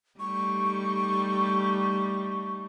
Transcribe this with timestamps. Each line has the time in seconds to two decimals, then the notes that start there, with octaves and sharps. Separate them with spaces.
0.20 G3 A3 D#4 C#6